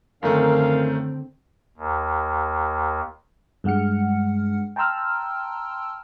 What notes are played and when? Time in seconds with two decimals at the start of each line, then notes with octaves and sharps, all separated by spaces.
0.23 F#2 D3 D#3 A3 C4 A#4 F5
1.78 D#2
3.64 G2 G#3 F#5 F6 C#7
4.76 G5 A5 A#5 C6 E6 F6